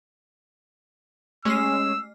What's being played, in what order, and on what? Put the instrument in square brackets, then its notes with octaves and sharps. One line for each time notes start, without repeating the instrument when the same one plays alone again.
[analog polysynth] G#3 C#4 [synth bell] A3 F6 C7 [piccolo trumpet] E6